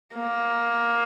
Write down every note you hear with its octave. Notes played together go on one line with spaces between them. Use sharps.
A#3